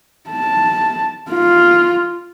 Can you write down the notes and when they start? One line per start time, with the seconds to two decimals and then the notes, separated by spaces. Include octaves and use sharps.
0.29 A5
1.30 F4